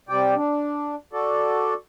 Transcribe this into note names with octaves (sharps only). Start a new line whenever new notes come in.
C3 G3 D5 G5
D4
F#4 A4 D5